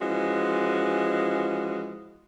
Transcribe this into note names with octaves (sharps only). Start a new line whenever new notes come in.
E3 F3 G#3 C#4 F#4